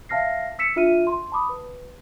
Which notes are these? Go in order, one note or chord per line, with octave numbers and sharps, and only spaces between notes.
E5 F5 A5 F6 A#6 C7
E6 B6 C#7 E7
D4 F4 E5 F6 D#7
C6
A5 B5 D6 D#6
B4